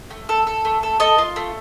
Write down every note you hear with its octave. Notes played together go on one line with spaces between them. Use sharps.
A3
A4
A4
A3
A4
A4 D#5
F4
A3